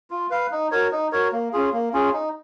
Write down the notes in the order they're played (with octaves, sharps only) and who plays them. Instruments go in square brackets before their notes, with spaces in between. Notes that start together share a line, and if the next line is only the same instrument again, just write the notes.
[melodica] F4
B4 F5
D#4
F#4 A#4 C#5
D#4
F#4 A#4 C#5
A#3
C#4 F4 G#4
A#3
C#4 F4 G#4
D#4